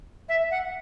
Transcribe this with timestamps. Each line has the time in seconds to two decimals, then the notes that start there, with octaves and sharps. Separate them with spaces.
0.29 E5
0.51 F#5